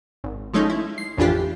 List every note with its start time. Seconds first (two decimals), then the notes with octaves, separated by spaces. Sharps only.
0.24 G#1
0.53 F3 G#3 A3 C#4 D#4
0.70 E4
0.98 C7
1.17 A1 F2 E3 D4 F4 G4